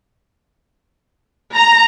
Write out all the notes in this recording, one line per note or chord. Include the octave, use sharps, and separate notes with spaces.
A#5